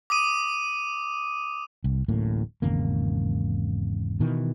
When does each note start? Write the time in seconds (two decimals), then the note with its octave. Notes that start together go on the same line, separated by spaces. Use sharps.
0.10 D6 D#6 D#7
1.84 C2
2.08 D1 A1 A2 A#3
2.62 G#1 E2 C#3 A#3
4.20 B2 D#3 E3